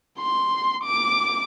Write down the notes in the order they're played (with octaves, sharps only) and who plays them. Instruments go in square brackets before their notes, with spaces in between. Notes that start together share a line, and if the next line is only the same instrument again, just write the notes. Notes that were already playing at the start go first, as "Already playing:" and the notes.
[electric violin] C6
D6